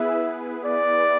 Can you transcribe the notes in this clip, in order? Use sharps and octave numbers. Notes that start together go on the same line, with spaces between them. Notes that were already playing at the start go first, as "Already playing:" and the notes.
Already playing: B3 E4 G#4 B4 E5
D5